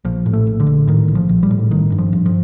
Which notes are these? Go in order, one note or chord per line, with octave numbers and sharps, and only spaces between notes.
A#1 F3
A2
A3
A#1
D3
A#1
A2 D#3
A#1
F3
A#1
G3
A2
A1 D#3
G2
F3
G2
F3